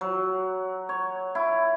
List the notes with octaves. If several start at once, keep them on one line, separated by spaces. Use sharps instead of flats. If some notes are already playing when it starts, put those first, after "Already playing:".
F#3
C#5
E4